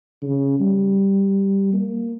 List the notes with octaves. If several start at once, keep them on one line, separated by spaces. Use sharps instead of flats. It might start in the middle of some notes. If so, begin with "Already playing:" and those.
C#3
G3
A#3